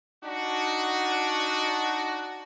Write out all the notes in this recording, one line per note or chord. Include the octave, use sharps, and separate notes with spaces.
D4 D#4 F#4